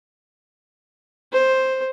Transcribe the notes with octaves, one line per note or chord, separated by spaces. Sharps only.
C5